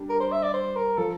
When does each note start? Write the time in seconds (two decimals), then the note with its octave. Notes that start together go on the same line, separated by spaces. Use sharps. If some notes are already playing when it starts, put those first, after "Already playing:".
Already playing: G3 D4
0.09 A#4
0.20 C5
0.32 E5
0.43 D5
0.54 C5
0.76 A#4
0.97 F3 A4